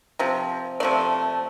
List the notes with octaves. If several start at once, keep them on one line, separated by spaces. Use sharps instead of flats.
C3 F3
C3 F3 A3 D5